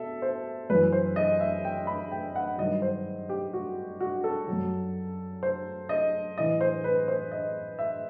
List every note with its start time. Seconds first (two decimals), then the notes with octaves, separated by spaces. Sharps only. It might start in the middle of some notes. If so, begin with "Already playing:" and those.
Already playing: B2 A4 E5
0.22 C5
0.70 F#2 E3 B4
0.92 C5
1.16 D#5
1.40 E5
1.65 G5
1.87 B5
2.12 G5
2.36 F#5
2.58 G2 D#3 F#3 D#5
2.82 C5
3.29 G4
3.53 F#4
4.00 F#4
4.24 A4
4.47 F#3
4.53 F#2
5.43 C5
5.89 D#5
6.38 A2 E3 D#5
6.61 C5
6.84 B4
7.08 C5
7.31 D#5
7.79 E5